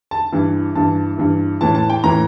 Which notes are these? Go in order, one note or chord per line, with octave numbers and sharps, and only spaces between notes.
A5
G2 E3
G2 E3 A5
G2 E3
A2 E3 A5
A5
G5
A2 E3 A#5